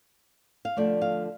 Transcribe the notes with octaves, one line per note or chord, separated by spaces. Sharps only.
F5
D3 F3 A3 D5
F5